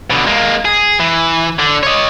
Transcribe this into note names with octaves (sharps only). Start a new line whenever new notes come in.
B2 D3
G#3 A#3
G#4
E3
D3
C#5 D#5